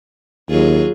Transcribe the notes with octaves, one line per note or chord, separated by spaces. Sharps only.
D#2 F#3 F4 G#4